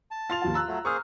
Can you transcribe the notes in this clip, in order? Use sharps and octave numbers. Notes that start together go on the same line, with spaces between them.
A5
F4 C6 A6 F7
D#2 F3 F5
A#5 E6 F#6
F#3 A3
A#3 G#4 C5 C#6 D#6 F6